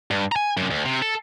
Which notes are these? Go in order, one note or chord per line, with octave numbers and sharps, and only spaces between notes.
G2
G#5 A#5
F#2 C3
D2
C3
A4